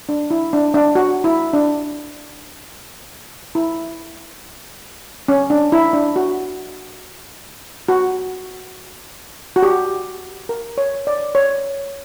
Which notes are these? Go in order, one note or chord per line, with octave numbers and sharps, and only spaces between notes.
D4
E4
D4
D4
F#4
E4
D4
E4
C#4
D4
E4
D4
F#4
F#4
F#4
G4
A#4
C#5
D5
C#5